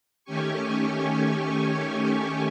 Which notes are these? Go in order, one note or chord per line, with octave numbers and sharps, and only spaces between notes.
D#3 A3 C#4 G4 G#5 C#6